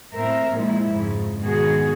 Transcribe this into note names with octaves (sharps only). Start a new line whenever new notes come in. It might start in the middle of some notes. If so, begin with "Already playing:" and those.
A2 C4 A#4 E5
A#2 F3 G#3 E4
F2 G#2 C#3
G#2 B2 D#3 F#4 G#4